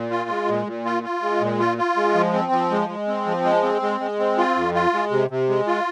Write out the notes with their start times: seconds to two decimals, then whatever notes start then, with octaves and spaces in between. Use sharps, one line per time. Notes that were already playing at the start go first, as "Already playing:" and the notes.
Already playing: A#2
0.11 F4
0.29 G#3
0.48 A#2
0.67 A#2
0.85 F4
1.03 F4
1.22 G#3
1.41 A#2
1.59 F4
1.78 F4
1.97 G#3
2.15 F3
2.33 C4
2.52 F3
2.71 G#3
2.89 G#3
3.08 C4
3.26 F3
3.44 G#3
3.63 C4
3.82 G#3
4.00 G#3
4.19 C4
4.38 F4
4.56 F2
4.74 F4
4.93 G#3
5.11 C3
5.30 C3
5.49 G#3
5.67 F4